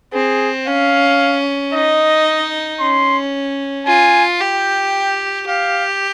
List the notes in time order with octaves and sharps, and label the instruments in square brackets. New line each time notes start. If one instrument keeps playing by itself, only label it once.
[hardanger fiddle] C4 [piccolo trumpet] G#4
[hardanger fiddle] C#4 [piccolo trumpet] F5
[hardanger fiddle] D#4 [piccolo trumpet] D#5
[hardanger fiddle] C#4 [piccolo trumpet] C6
[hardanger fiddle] F4 [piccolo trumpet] G#5
[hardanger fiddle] G4 [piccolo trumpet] G5
[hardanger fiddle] G4 [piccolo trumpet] F5